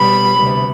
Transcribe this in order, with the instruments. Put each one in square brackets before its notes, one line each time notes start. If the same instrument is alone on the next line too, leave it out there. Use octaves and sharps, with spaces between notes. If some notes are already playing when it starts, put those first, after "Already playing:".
Already playing: [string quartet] B2 G3 B3 B5
D2 C3 G3 B3